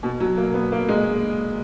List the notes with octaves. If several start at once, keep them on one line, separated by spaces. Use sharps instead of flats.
B2
F#3
A#3
B3
A#3
G#3